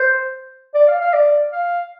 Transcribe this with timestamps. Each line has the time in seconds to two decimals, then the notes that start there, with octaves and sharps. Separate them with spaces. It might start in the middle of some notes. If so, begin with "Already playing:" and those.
Already playing: C5
0.74 D5
0.88 F5
1.01 F5
1.13 D5
1.52 F5